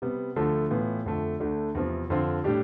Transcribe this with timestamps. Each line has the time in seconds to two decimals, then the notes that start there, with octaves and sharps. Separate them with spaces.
0.02 C3 G3 B3
0.36 D2 D3 F3 A3
0.70 A2 E3 B3 F4
1.06 F2 D3 A3
1.40 D2 D3 A3 D4
1.75 E2 C3 F3 C4
2.10 F2 D3 F3 C4 F4
2.44 A2 G3 D4 G4